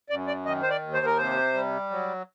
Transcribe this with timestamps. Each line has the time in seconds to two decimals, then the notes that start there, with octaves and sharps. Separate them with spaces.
0.10 F#2 D5
0.27 D5
0.46 D#3 D#5
0.63 C5
0.70 D5
0.82 D#2
0.94 C5
1.06 A#4
1.17 C3 C5
1.54 G3
1.90 F#3